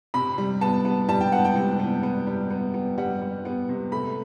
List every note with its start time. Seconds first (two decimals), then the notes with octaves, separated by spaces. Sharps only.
0.14 C3 B5
0.38 G3
0.61 B3 A5
0.85 B3
1.09 G3 A5
1.21 G5
1.32 B3 F#5
1.45 G5
1.56 C3
1.79 B3
2.03 B3
2.27 G3
2.50 B3
2.74 B3
2.98 G3 F#5
3.22 G3
3.45 B3
3.69 C3
3.92 A3 B5